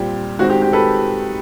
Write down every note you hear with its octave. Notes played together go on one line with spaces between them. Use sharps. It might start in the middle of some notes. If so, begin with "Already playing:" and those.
Already playing: A#2 G3 C4 G4
D#3 G#3 C4 F#4
G4
G4
A4 B4